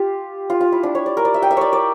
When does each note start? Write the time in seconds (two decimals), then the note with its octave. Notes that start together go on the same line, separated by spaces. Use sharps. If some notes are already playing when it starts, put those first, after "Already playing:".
Already playing: F4 G4
0.50 F4
0.61 F4
0.72 E4
0.83 D4
0.95 C#5
1.06 D5
1.17 A#4
1.25 D5
1.34 E5
1.42 G5
1.51 E5
1.57 C#5 D5
1.73 D5